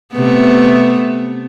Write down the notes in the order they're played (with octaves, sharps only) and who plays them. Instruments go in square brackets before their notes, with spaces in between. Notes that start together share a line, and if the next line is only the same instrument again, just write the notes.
[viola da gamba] C3 A3 B3